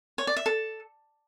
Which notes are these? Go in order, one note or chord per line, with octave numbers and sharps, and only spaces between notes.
C#5
D5
E5
A4